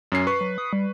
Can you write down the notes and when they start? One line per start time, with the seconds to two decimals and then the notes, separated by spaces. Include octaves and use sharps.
0.12 F#2 C#4 C7
0.27 B4 C#6 C7
0.41 F#3
0.58 D#6
0.73 G3